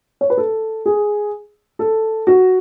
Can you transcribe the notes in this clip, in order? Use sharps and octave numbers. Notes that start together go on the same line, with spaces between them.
C#5
B4
A4
G#4
A4
F#4